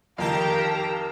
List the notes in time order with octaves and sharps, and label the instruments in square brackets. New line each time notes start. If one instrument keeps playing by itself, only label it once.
[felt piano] F2 D#3 [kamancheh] G4 A#4 [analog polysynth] F5 G5 A#5 [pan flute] A5